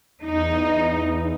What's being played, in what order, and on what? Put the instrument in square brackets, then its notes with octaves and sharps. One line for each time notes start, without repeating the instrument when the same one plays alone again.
[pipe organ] E2 [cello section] D#4